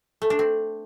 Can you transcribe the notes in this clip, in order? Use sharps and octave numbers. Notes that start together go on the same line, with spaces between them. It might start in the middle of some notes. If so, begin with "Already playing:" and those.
A3
D4
C4